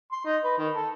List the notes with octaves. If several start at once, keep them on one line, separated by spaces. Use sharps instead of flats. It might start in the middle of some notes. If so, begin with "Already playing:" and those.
C6
D#4
B4
D#3
A4